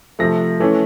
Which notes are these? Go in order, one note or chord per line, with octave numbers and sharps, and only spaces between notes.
C3 F3 A3 A#6
E3 A3 C#4